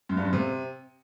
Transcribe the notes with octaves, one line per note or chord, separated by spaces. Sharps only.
F#2
G2
F#2
C3